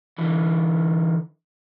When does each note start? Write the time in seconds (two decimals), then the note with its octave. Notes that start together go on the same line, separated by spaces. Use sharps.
0.18 D3 E3